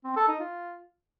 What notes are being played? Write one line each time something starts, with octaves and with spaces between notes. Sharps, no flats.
C4
A4
D#4
F4